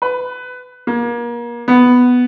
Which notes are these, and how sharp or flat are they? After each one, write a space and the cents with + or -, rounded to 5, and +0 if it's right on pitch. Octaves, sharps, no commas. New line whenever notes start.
B4 +20
A#3 +30
B3 +5